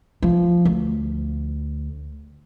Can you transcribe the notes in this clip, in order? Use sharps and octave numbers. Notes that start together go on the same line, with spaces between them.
F3
D2